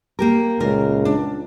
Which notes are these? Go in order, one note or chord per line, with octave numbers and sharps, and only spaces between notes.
A#3 G4 A#4
C#2 A#2 A#4
D4